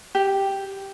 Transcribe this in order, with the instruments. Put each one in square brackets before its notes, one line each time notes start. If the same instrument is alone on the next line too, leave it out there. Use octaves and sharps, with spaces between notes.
[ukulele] G4